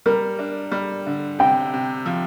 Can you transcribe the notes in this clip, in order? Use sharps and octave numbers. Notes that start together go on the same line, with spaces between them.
G3 A#4
D4
G3
D3
C3 G5
C3
F3